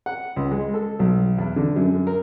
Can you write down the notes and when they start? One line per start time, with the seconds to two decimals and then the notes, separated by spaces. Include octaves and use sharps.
0.06 F#5
0.36 C#2
0.51 G#3
0.74 A4
0.99 B1
1.38 E2
1.56 D3
1.76 F#2
2.07 A#4